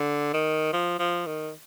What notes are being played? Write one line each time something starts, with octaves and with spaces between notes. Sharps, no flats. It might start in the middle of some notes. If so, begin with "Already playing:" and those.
Already playing: D3
D#3
F3
F3
D#3